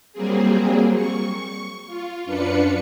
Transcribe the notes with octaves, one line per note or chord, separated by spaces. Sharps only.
F#3 G3 A#3 C4 G#4
C#6
F4
F#2 D4 F4 B4 C#7